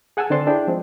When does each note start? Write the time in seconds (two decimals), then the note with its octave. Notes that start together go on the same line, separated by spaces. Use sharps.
0.17 G#4 F#5 G#5 A5 E6
0.30 D3 C4 D4 D5 A5 C6
0.47 D4 E4 G#4 G5
0.67 F3 G#3 C4